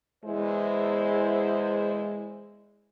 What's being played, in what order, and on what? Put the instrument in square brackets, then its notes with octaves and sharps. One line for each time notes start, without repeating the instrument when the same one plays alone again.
[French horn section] E2 E4 C5 [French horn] G#3